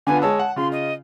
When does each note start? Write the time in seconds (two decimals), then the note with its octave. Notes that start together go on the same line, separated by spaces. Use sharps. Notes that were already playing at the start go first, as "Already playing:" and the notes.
0.07 D3 B3 F4 G#5
0.22 G#3 C#5 A5 E6
0.39 F#5
0.56 C#3 F4 C6
0.72 D#5